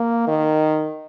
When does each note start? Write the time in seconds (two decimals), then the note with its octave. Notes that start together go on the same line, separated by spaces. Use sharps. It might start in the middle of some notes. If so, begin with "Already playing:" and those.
Already playing: A#3
0.28 D#3